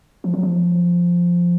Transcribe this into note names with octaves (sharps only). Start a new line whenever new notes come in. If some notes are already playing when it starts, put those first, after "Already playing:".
F3
F#3
F3